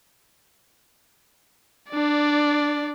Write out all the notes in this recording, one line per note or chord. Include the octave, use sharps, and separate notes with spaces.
D4 D5